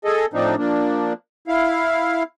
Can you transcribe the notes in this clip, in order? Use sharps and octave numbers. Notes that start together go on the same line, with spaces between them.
G#4 A4 D#5
A2 F3 C4 D4 D#4
F3 A#3 D4
E4 F5